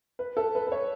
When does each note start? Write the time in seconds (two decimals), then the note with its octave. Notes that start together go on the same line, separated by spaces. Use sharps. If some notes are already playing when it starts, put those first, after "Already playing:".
0.19 B4
0.37 A4
0.55 B4
0.67 B4
0.72 C#5